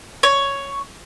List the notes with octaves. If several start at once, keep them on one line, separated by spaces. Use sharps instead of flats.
C#5